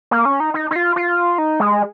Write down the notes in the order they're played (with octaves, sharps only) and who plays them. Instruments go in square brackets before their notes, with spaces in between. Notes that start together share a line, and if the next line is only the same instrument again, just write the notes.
[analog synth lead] A#3
C#4
D#4
D#4
D#4
F4
F4
D#4
G#3